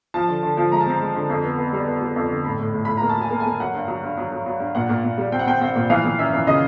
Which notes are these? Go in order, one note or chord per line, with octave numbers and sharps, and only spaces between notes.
F3 A5
D3
D3
F3
G#3 A#5
A5
C4 A#5
G#3
D3
F2
B3
B3
G3
B3
G3
F2
D3
A2 B5
A2
A2
A2 B5
A#3 A#5
A5
F#3 G#5
A#3
G#5
A#3
F#3 F#5
G2
F#3
G2
F#3
F#3
F#3
G2
A#2 F#5
A#2
A#2
G3
C4 G5
F#5
C4 G5
C4 F#5
A#2
E3 F5
E3
F#2 E5
E3
C#3 D#5